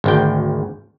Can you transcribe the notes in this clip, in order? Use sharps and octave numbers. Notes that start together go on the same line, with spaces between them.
G#1 D2 G5